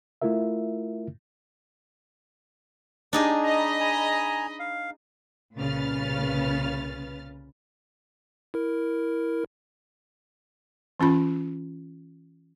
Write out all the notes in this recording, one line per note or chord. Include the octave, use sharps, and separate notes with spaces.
A3 E4 F4 A#4 E5
D4 D#4 G4 G#4
D#5 A#5 B5
G#5 A#5
F5
C2 A#2 C#3 B4 F6 A6
E4 A#4
E3 C#4 F4 B5